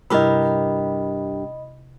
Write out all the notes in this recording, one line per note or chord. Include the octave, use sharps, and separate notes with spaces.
G2 C3 E4 G4 A#4 D#5 B5